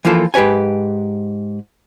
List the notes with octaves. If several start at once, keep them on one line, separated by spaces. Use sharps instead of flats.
E3 F3 A#3 F4 A4
G#2 G4 B4 C#5 G#5